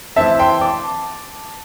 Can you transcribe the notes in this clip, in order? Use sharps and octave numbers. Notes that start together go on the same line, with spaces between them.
E3 C4 E5 A5
G5 C6
A5 D6